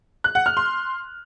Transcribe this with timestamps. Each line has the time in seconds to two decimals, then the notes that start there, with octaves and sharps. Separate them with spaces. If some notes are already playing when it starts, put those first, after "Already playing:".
0.24 F#6
0.35 F#5
0.46 F6
0.57 C6